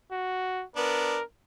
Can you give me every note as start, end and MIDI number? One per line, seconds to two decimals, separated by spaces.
0.12 0.64 66
0.76 1.18 59
0.76 1.18 62
0.76 1.23 70